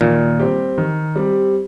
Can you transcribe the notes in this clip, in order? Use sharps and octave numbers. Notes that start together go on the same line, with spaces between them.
A#2 D#3
G3 C4 G4
D#3
G3 C4 G4